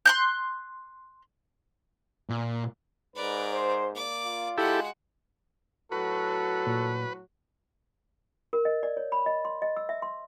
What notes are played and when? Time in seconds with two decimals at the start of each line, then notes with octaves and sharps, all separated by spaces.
0.06 C6 F#6 G6
2.29 A#2
3.16 G#2 A#4 B4 D5
3.52 C5
3.95 A#3 D5 D6
4.25 F4
4.58 G#3 E4 F#4 G4 A4 F#5
5.92 A2 F#3 F#4 A4 B4
6.67 A#2
8.53 A#4
8.65 D#5
8.83 D5
8.97 C#5
9.12 B5
9.26 D#5
9.45 C6
9.62 D#5
9.77 E6
9.89 E5
10.02 C6